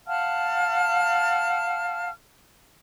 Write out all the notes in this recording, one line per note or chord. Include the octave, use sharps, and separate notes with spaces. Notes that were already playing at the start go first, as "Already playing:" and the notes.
F5 F#5 A5 F6